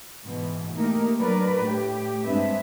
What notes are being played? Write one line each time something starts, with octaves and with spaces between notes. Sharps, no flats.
G#2 B2 E3
A3 A#3 D#4 G4 A#4
F#3 D4 A#4 B4 D5
A2 G4
G2 G#3 C4 D4 B4 E5